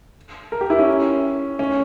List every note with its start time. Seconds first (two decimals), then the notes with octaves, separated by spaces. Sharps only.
0.52 A#4
0.61 G4
0.70 E4
0.79 C#4
1.59 C#4